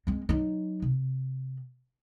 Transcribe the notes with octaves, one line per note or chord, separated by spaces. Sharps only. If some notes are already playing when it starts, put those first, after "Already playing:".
G#3 C4
F#3 D#4
C3